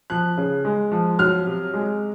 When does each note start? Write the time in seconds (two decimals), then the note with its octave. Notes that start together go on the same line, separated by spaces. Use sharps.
0.10 F3 F#6
0.37 C#3
0.65 G#3
0.92 F3
1.19 F#3 F6
1.46 C3
1.74 G#3